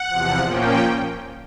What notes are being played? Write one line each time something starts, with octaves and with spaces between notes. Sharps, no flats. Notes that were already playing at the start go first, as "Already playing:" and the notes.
Already playing: F#5
E2 C3 F3
A#2 F3 A#3 C#4 G5